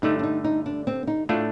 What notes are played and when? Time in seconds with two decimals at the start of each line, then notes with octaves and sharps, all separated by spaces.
0.02 G2 D3 A3 D#4
0.19 D4
0.23 D#4
0.44 D#4
0.66 D4
0.87 C4
1.07 D#4
1.29 A2 A3 D4 F4